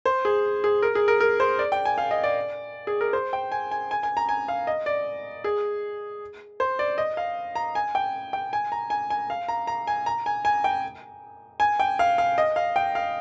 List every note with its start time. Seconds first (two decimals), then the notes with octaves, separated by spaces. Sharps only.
0.06 C5
0.25 G#4
0.64 G#4
0.82 A#4
0.95 G#4
1.08 A#4
1.20 A#4
1.40 C5
1.59 D5
1.72 G5
1.85 G#5
1.98 F5
2.11 D#5
2.24 D5
2.87 G#4
3.01 A#4
3.13 C5
3.33 G5
3.52 G#5
3.71 G#5
3.91 G#5
4.03 G#5
4.17 A#5
4.29 G#5
4.48 F5
4.67 D#5
4.86 D5
5.44 G#4
6.60 C5
6.79 D5
6.98 D#5
7.17 F5
7.55 A#5
7.75 G#5
7.95 G5
8.33 G5
8.53 G#5
8.72 A#5
8.90 G#5
9.10 G#5
9.30 F5
9.48 A#5
9.67 A#5
9.87 G#5
10.06 A#5
10.26 G#5
10.45 G#5
10.64 G5
11.60 G#5
11.80 G5
11.99 F5
12.18 F5
12.38 D#5
12.56 F5
12.76 G5
12.95 F5